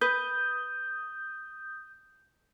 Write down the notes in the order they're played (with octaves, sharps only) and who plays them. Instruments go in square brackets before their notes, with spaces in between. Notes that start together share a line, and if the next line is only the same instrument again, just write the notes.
[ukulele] B4 [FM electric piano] D#6 G6